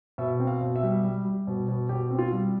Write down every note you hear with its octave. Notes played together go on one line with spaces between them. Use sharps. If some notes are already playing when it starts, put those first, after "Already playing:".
B2 E5
C4
F5
B2
E5
G3
G3
G3
B2
B2
B2 G4
C4
F4
G3